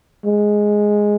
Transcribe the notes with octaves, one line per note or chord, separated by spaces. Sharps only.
G#3